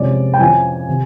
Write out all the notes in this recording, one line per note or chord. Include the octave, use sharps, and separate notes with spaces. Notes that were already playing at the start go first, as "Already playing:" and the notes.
Already playing: F2 C3 F3 G#3 C#4 D5
G5
F2 C#3 F3 G#5
C3